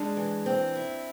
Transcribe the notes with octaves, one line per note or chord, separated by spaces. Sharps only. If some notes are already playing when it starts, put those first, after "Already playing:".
Already playing: G#3 D4
E3
C4
E4